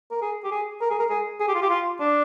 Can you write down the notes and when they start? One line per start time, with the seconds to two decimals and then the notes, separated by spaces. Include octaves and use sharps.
0.11 A#4
0.21 G#4
0.44 G4
0.52 G#4
0.81 A#4
0.90 G#4
0.99 A#4
1.10 G#4
1.40 G#4
1.48 G4
1.55 F4
1.62 G4
1.70 F4
2.00 D4